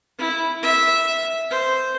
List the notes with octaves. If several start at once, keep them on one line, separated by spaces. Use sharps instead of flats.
E4
E5
C5